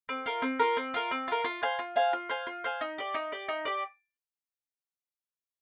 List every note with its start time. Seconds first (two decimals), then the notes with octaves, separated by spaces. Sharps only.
0.09 C4
0.26 F4 A#4
0.42 C4
0.59 F4 A#4
0.77 C4
0.94 F4 A#4
1.11 C4
1.28 F4 A#4
1.44 F4
1.63 C5 F5 G#5
1.79 F4
1.96 C5 F5 G#5
2.13 F4
2.29 C5 F5 G#5
2.47 F4
2.64 C5 F5 G#5
2.81 D#4
2.98 G4 D5
3.14 D#4
3.32 G4 D5
3.48 D#4
3.65 G4 D5